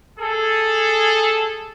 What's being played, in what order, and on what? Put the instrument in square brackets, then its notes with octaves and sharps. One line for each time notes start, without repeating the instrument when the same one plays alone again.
[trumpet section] G#4 A4